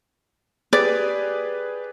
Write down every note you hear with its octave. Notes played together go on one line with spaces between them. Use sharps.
G4 G#4 B4 D5